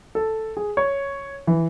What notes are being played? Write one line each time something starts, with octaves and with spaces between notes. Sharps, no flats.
A4
G#4
C#5
E3